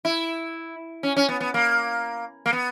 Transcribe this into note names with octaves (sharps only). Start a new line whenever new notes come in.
E4
C#4
C#4
B3
B3
A#3
A#3
B3